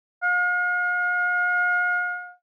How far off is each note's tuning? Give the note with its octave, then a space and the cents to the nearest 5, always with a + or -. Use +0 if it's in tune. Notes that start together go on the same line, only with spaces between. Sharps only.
F5 +45